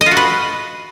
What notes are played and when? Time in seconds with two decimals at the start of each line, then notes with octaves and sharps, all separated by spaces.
0.01 D#5
0.06 F4
0.11 F#4
0.17 B4